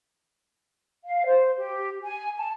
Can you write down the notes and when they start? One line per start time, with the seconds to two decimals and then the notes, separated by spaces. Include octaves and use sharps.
1.05 F5
1.25 C5
1.57 G4
2.04 G#5
2.37 A5